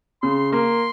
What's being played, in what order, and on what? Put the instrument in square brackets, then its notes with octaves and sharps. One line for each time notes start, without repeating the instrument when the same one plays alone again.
[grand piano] C#3 [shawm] C6
[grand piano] A#3 [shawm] C6